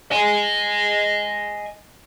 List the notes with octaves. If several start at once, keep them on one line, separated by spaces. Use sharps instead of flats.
D#5 G#5